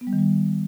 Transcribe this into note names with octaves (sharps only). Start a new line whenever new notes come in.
B3
G3
D#3
G3